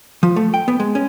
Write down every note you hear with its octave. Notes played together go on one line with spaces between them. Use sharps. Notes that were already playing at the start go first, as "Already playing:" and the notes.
F3
A3
G5
B3
G#3
C#4